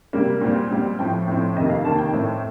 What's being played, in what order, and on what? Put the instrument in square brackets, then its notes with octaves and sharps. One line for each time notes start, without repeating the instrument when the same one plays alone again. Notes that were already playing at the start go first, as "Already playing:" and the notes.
[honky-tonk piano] C3 G3 A#3
A#2 G3 C4
A#2 G3 C4
A2 F3 C4 G5
A2 F3 C4
F2 C3 D#3 A#3 D#5
F5
F2 C3 D#3 A#3 A5
G5
A2 A3 C4